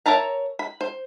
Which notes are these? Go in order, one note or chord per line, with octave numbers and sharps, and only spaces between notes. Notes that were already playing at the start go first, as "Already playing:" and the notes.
A#4 C#5 E5 A5 A#5
B5
C5